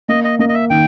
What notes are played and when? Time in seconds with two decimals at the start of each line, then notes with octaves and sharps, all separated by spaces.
0.09 A#3 D#5
0.24 D#5
0.39 A#3 D#5
0.49 D#5
0.54 E5
0.70 D#3 G5